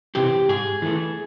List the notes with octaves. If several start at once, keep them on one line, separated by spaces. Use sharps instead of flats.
C3 E3 C4 G4
G#2 G#4
E3 A3